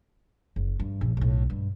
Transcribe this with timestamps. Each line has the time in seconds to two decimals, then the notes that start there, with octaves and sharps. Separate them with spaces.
0.56 F#1
0.80 G2
1.01 A#1
1.17 B1 A2
1.50 G2